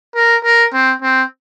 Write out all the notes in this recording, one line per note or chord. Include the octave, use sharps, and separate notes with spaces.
A#4
A#4
C4
C4